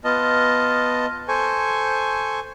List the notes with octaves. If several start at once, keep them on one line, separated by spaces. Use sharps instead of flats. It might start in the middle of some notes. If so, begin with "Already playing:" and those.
B3 F4 D#5 A5
A4 C5 G#5 C#6